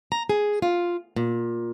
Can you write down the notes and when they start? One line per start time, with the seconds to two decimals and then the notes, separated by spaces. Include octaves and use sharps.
0.12 A#5
0.29 G#4
0.62 F4
1.16 A#2